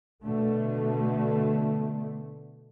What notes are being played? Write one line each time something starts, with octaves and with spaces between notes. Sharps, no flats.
B2 D3 A3